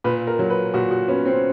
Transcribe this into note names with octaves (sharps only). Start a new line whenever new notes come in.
A#2 B4
A#4
F#3
B4
A#2 F#4
F#4
B3 C#4
C4